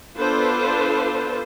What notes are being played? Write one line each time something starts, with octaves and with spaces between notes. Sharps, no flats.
B3 D4 F4 A4 B4 C5